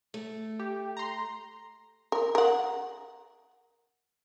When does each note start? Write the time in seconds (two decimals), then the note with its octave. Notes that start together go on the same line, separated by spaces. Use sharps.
0.14 A3
0.59 G4
0.97 A#5 C6
2.12 A#4
2.35 A#4 F#5